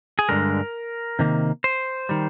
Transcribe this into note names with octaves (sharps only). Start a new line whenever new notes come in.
G#4
G2 D3 G#3 A#4
C3 D#3 A#3
C5
D#3 G3